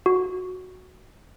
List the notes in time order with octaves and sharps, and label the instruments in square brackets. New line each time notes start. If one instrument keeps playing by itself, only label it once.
[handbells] F#4